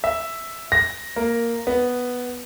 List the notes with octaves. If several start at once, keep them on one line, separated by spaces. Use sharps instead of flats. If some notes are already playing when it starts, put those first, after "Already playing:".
E5
A#6
A#3
B3